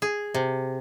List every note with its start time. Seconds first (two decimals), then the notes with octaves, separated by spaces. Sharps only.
0.02 G#4
0.34 C3